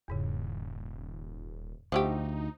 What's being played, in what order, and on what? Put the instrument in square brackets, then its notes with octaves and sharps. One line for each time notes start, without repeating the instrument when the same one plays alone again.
[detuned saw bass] D#1 [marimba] E2 G#2 C#3
[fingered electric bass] D2 [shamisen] F3 A3 G4 [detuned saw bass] D#4 [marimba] C5 E5 F#5